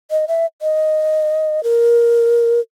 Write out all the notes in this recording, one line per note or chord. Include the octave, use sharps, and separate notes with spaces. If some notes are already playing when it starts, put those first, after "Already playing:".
D#5
E5
D#5
A#4